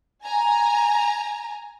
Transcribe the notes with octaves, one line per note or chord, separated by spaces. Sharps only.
G#5 A#5